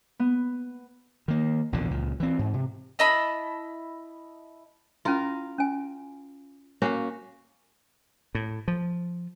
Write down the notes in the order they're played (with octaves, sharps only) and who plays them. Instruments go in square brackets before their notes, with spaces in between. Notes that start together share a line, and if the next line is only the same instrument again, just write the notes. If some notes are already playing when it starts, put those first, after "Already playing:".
[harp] B3
[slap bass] D#3 A#3
A#1 E2 B2 D3
C#2 A#2
E3 C4
G#2
C3
[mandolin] E4 D#5 A5 B5
[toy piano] C#4 E4 B5 [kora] F4 A#4
[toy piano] C#4 G#5
[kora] A#3 C#4 F#4 [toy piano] C#5 F5 F#5
[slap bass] A2
F3